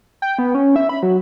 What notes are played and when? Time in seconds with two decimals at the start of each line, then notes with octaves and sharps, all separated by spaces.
0.22 G5
0.38 B3
0.55 C#4
0.76 E5
0.89 B5
1.03 F#3